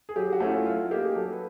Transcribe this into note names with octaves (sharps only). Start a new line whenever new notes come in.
G#4
F#3 G4
F#4
A3 C#4 E4
F4
F#3 F4
A#3 D#4 G4
G#4
F#3 A4
B4